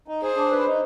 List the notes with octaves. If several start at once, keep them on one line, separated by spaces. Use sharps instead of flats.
D#4
G#4 C5
D4
B4
D#4